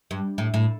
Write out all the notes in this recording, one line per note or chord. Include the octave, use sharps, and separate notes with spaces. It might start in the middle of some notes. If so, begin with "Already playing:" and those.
G2
A2
A2